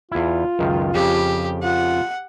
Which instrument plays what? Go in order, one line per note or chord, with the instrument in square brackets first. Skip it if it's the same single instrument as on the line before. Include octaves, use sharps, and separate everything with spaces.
[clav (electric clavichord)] E2 E4 [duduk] F4
[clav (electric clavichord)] C#2 F#2 D#3
[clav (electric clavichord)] F2 C#3 [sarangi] G4
[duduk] F4 [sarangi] F#5